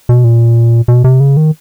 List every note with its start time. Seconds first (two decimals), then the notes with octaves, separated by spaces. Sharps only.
0.09 B2
0.24 A#2
0.88 B2
1.04 C3
1.20 C#3
1.37 D#3